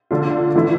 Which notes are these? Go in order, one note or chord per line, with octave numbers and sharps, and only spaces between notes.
D3 A3 D4 F4
E3 A3 E4